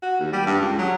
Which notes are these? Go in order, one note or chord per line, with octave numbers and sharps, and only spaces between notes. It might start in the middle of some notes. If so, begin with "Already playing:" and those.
F#4
D#2
G3
G2
C#2
F#3